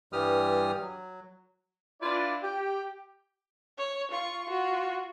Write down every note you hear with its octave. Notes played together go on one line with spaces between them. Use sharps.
G2 E3 G3 G4 D#6 F6
F#3
D4 E4 F4 B4 D5
G4 G5
C#5
F4 C#6
F4 F#4